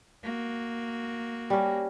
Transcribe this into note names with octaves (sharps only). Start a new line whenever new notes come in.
A#3 F#4
G3 C#4